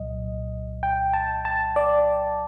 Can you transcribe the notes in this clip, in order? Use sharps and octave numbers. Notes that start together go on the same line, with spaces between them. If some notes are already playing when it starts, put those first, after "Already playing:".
Already playing: C2 A#2 F#3 D#5
G5
A5
A5
D5